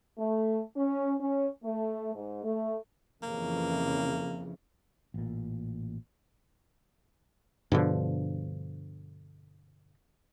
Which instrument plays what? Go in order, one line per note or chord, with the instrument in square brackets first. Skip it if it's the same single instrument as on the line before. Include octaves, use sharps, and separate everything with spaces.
[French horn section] A3
C#4
C#4
A3
G#2
A3
[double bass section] F2 C#3 E3 [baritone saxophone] A#3
[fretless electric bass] A1 A#2
G2 B2 D3 F3